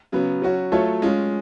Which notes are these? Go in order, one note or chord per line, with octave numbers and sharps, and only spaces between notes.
C#3 F#3 B3
F#3 C#4 F#4
F#3 A3 F4 A4 C#5
G#3 C#4 F4